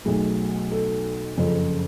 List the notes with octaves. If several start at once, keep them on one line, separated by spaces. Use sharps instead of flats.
B1 B2 F#3 A3 G#4
A4
F#1 F2 C#3 A4